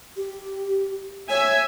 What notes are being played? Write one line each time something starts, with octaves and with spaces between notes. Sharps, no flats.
G4
C#5 E5 G#5